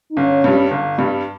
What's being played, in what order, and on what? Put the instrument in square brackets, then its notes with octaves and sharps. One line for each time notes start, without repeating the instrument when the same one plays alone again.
[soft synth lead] D#4
[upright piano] G1 [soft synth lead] C#4
[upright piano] G2 G3
G1
G2 G3